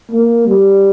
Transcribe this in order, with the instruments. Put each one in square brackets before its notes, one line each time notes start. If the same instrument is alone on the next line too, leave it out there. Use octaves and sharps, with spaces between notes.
[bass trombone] A#3
G3